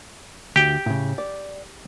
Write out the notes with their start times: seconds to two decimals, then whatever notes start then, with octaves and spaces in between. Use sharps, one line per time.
0.56 D2 G4 G5
0.86 A2 C#3
1.18 D5